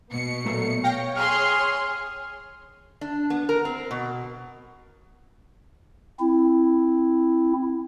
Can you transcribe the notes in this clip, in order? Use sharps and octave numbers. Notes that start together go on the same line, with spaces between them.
B2 B3 C#7
A#2 F#3 A3
C#5 F5 G5 A#6
G#4 C6 F6
D4
B3
A#4
C4
B2
C4 E4